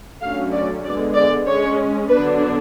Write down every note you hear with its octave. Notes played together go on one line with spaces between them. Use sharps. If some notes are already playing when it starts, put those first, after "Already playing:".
D3 F#3 A3 C#4 F5
D5
D3 G#3 B3 D5
D5
G#3 C#4 C#5
D3 F#3 B3 D4 B4